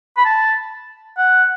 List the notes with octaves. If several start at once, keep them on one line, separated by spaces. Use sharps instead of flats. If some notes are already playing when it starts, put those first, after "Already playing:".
B5
A5
F#5